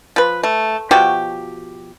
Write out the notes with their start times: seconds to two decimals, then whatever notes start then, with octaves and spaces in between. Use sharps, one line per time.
0.16 F3 B4
0.43 A3
0.91 B2 F3 F#4 G4